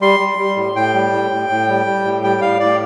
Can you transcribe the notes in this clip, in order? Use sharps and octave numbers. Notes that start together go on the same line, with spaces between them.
G3 C6
G3
G3
A2
A2 G5
G3
A2
A2
A2
G3
G3
A2
G3 G5
A2 F5
A2 D5